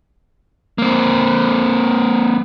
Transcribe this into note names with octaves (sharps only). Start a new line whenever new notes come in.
A#3 C4